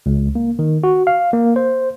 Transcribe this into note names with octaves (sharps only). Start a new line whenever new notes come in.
C#2
A#3
D#3
F#4
F5
A#3
C5